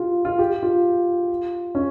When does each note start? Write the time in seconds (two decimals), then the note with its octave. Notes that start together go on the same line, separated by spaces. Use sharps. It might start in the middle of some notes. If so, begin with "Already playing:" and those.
Already playing: F4 G4
0.25 F4
0.39 G4
0.63 F4
1.75 C#4